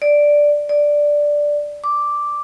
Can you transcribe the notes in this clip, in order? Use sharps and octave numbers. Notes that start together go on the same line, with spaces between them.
D5
D5
D6